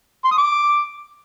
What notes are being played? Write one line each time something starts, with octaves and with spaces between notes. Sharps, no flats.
C6
D#6
D6